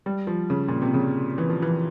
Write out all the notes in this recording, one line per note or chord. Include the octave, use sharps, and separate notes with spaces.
G3
F3
C#3
A#2
C3
C#3
E3
F3
E3